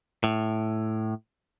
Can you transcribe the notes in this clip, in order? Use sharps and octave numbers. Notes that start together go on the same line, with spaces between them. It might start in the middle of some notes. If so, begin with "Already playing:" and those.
A2